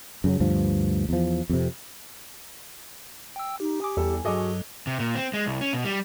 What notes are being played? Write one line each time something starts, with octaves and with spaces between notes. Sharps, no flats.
F#2 C#3 F#3
D2 G2 F3
E2 F3
F2 C3
G5 E6
D#4 G4
G#5 D6 D#6
E2 G3 A4
G2 F#3 F#4 G#4 A4 D#5 C#6 D6
C3
A#2
C4
G#3
C2
C#4
B2
G3